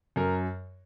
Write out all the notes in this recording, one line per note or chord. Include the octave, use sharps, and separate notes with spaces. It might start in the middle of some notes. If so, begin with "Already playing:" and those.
F#2 A#4